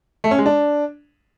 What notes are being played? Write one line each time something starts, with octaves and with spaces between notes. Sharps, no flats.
A3
C#4
G#3
D4